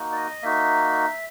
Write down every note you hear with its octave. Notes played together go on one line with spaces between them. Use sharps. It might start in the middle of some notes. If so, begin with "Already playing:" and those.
Already playing: A#3 D#4 F#4
D5
D#5
A#3 D#4 F#4 E5